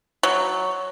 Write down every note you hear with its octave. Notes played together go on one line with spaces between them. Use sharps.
F#3